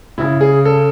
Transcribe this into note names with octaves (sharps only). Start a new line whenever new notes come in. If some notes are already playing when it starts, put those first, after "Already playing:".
C#3 E4
G#4
A4